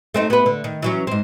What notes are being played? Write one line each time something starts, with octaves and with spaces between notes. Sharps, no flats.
A3 C4 D#4
B3 B4
D3
D#3
E3 F#3 C#4
G#2 C4